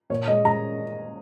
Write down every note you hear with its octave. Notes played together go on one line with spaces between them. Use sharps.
A#2 C#5
G#3 D#5
G#3 A#5